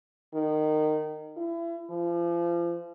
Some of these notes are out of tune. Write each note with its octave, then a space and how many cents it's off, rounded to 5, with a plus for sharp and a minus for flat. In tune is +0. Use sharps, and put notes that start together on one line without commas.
D#3 -20
E4 +35
F3 -30